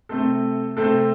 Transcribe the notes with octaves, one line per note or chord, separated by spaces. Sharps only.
C3 A3 C4 A4
C3 A3 C4 A4